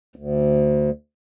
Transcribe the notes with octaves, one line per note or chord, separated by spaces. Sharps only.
D2